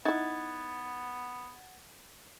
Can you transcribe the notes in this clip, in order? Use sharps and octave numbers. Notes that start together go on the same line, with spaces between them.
B3 D#4 E4 F#5 G#6 A6